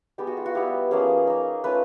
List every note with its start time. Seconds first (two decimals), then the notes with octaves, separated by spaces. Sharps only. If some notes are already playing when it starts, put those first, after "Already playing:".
0.18 G#3 B3 D#4 G4
0.27 F#4
0.37 F4
0.46 F#4
0.55 G3 B3 E4 G4
0.91 F3 A#3 C#4 G#4
1.27 A#3 D#4
1.64 A3 C#4 F4 B4